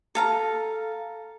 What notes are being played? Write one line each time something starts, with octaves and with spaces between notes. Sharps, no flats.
A4 F5 A#5